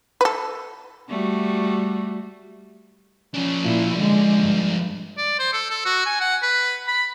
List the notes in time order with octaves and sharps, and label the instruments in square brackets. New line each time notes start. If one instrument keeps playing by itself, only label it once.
[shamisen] A4 B4
[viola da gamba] G3 A3 F#4
[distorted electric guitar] F3 D4 [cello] C#4
[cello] A#2 E4
D3 G#3
G2
[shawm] D5
C5
A4
A4
F#4
G#5
F#5
B4
B5